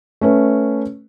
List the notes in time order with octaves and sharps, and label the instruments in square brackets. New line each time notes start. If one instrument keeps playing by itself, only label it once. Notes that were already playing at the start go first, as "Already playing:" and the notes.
[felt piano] A3 C#4 B4